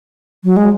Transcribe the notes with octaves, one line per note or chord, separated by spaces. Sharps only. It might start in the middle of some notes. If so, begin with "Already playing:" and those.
F#3
G#3